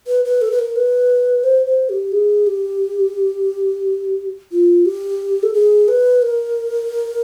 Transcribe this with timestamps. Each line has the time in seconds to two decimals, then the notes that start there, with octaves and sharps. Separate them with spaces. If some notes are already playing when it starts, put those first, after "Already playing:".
0.07 B4
0.25 B4
0.42 A4
0.51 B4
0.59 A#4
0.76 B4
1.44 C5
1.66 C5
1.89 G4
2.12 G#4
2.47 G4
4.52 F4
4.86 G4
5.43 A4
5.54 G#4
5.88 B4
6.22 A#4